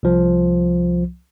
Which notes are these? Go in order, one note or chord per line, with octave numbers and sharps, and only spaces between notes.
C2 F3